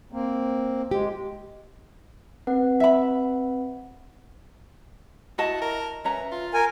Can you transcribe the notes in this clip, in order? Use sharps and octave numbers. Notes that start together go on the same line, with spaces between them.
A#3 C4
G#3 G4
C4 B4 F#5
E5 B5
E4 F#4 D#5 A5
A#4
C#4 B4 E5 A#5
F4
A#4 G#5